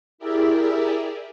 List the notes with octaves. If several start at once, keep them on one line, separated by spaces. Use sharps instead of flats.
E4 G4 G#4 A#4 D5 E5